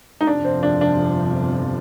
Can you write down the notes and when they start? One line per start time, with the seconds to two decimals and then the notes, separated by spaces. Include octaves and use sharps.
0.21 D#4
0.27 G1 F2 C3 F3 D4
0.44 C4
0.63 D4
0.81 D4